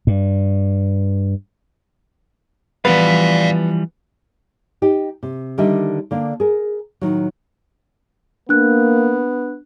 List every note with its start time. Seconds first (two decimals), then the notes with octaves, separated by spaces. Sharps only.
0.07 G2
2.85 E3 F3 G3 B3 D5 F5
4.82 D#4 G4
5.23 C3
5.58 D3 D#3 G3 D4 D#5 E5
6.11 D3 A#3 D4
6.40 G#4 A#4
7.01 A2 D#3 F#3
8.49 A#3 B3 D4 F#6